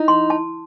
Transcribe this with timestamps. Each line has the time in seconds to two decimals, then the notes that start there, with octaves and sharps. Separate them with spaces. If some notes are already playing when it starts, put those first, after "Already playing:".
Already playing: D#4 E4
0.08 C6
0.30 A5